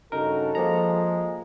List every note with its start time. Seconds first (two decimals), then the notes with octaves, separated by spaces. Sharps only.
0.12 G2 C#3 D#4 F#4 A4 A#4
0.55 F3 G#3 A#3 A#5